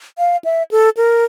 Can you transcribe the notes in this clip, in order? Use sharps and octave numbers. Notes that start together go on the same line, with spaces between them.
F5
E5
A4
A#4